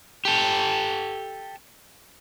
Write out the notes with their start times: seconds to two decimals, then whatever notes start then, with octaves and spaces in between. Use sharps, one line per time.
0.25 G4 A4